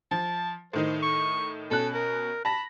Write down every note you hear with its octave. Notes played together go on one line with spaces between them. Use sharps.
F3 A5
A2 D#3 D#4 C5
C#6
B2 C#4 A4 F#6
A#4
A5 B5 A#6